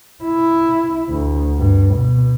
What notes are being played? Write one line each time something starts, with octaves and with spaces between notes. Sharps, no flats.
E4
D2
G2
B2